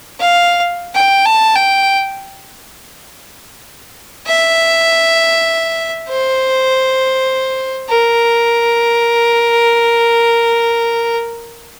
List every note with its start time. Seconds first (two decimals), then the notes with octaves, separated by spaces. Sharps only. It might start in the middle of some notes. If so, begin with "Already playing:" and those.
0.20 F5
0.95 G5
1.25 A5
1.55 G5
4.27 E5
6.09 C5
7.89 A#4